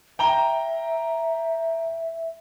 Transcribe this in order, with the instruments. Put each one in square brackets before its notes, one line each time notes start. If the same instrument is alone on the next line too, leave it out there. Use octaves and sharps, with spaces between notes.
[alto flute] E5 [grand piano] G5 A#5 G7